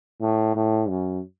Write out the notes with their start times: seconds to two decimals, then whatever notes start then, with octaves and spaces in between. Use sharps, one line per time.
0.21 A2
0.55 A2
0.89 F#2